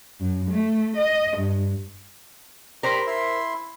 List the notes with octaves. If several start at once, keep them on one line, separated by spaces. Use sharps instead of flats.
F#2
A3
D#5
G2
G4 A#4 C5 A#5 B5
E4 E5 C6